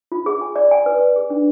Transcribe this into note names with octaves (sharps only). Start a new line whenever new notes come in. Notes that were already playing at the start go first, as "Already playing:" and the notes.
F4
G#4
G#5
D5
G#5
B4
D5
G#4
D4